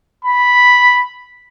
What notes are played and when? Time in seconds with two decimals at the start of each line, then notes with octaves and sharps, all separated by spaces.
0.25 B5